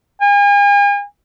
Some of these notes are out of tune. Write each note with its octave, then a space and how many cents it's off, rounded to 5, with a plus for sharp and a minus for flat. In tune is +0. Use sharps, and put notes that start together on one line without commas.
G#5 -40